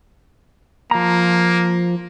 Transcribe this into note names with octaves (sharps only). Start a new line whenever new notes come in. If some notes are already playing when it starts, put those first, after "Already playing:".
F3 A#3 A#5